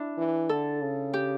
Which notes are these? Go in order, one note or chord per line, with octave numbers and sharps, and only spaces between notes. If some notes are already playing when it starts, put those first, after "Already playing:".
Already playing: D4 E4
E3
D3 A4
C#3
G4